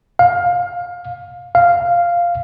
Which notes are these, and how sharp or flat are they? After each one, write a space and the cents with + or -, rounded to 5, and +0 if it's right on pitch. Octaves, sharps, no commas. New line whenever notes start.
F5 +20
F5 -5